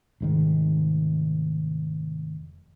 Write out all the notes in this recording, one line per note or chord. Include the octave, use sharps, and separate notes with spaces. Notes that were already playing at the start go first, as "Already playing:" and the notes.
F1 G#2 D#3